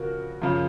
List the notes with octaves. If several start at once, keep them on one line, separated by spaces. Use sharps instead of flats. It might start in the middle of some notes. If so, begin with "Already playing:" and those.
Already playing: C#3 F3 F#4 A#4
F#2 C#3 F3